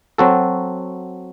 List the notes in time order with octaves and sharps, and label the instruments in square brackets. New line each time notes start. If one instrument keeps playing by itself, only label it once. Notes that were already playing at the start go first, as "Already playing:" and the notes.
[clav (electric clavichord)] F#3 C4 F#4 A4